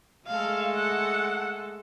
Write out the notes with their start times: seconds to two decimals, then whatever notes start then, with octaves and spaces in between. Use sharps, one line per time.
0.27 G#3 A3 A4 F5
0.75 F#5